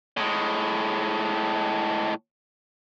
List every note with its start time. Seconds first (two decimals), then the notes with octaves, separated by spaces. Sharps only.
0.17 A2 G#3